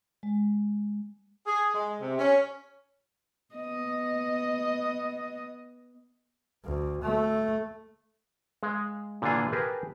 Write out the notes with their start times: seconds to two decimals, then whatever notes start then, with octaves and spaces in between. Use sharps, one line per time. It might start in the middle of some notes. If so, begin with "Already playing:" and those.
0.23 G#3
1.47 G#4
1.75 G#3
2.01 C3
2.19 C#4
3.55 B3 D#5
6.65 D2
7.02 A3
8.63 G#3 F5
9.22 A#2 D3 E3 F4 G#4
9.52 G4 G#4 A#4 B4 A5